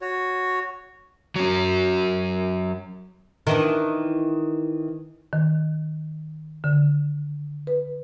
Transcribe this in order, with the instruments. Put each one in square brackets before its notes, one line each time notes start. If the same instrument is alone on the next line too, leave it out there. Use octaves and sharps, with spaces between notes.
[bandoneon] F#4 C#5
[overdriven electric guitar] F#3 C#4
[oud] D#3 E3 D4
[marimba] D#3
D3
B4